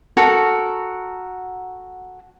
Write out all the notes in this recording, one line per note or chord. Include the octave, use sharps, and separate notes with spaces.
F#4 A4 A#4